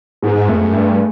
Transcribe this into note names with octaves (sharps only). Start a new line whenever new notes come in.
G#2 G#3
G#2
F2 A3
F#2
G2 A3